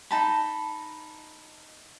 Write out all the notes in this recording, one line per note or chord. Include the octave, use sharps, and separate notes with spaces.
D#4 A5 B5